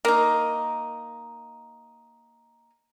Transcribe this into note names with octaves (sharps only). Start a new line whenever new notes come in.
A#3 D#4